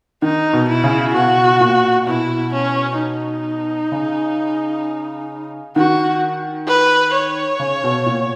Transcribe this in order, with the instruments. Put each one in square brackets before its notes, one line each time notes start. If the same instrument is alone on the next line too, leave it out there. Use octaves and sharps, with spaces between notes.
[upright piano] D#3 [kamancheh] D#4
[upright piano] B2
[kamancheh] E4
[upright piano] C#3
[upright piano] B2 [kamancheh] F#4
[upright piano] A#2
[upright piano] B2 [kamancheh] E4
[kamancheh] C#4
D#4
[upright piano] C#3
[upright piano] D#3 [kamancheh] F#4
[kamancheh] B4
C#5
[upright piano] C#3
B2
A#2